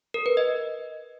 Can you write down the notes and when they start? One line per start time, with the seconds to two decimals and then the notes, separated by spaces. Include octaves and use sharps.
0.14 A#4
0.26 B4
0.37 D#5